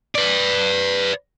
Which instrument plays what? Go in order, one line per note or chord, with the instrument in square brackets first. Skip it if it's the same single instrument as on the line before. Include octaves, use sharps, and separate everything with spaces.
[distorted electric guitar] B4 D5